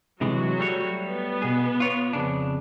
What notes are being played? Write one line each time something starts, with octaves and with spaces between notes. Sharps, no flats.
C3 E3 F#3 G#3 F#4
G3 A3 C#5
B3
B2 G#4
F4 C#5
F2 C#3 D4